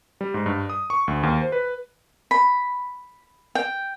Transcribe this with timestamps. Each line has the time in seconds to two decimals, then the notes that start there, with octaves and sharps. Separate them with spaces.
0.21 G3
0.34 G#2
0.46 G2
0.70 D#6
0.90 C#6
1.08 D2
1.23 D#2
1.41 C5
1.52 B4
2.31 B5
3.55 G5